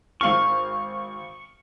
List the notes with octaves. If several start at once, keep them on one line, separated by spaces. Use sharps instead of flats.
G#1 F5 C#6 F6